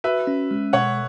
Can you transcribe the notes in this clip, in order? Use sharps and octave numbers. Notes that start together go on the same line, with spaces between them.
F#4 B4 E5
C#4
G#3
B2 C#5 F#5